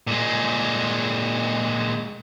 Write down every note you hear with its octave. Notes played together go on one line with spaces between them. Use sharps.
A#2 G#3